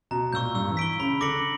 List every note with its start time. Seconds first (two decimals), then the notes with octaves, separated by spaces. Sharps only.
0.11 B2 A#5
0.33 A#2 C#6 E6 G6
0.55 G2 E6
0.70 E3
0.77 B6 D7 G7
0.99 C#3 B5
1.21 D3 D6 A#6 C#7 F#7